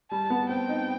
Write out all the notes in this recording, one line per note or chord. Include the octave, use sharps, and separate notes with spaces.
G3 A5
B3
C4 G5
D#4